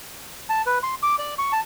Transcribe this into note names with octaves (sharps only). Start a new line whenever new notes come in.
A5
B4
C6
D6
D5
C#6
A5